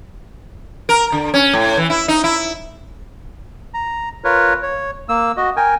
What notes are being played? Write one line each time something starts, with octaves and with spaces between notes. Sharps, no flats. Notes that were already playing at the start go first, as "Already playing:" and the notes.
A#4
D3
C#4
A2
E3
E4
D#4
E4
A#5
F4 A#4 B4 C#5
C#5
A#3 E6
F#4 D#5
A#4 G5 G#5